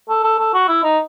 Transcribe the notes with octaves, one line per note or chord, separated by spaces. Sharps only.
A4
A4
A4
F#4
E4
D#4